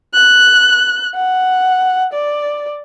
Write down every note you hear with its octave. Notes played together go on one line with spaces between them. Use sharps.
F#6
F#5
D5